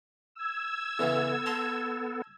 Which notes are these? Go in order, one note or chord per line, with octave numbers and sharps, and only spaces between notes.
E6 G#6
E2 C#3 E3 B3 A4
A5 A#5 C6